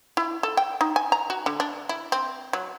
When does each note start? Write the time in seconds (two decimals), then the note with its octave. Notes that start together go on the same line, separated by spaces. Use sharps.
0.17 E4
0.43 A4
0.57 G5
0.81 D#4
0.96 G#5
1.12 A#5
1.30 F#4
1.46 D3
1.60 D4
1.89 E4
2.12 C4
2.53 F#3